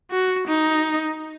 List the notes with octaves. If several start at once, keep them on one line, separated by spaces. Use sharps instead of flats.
F#4
D#4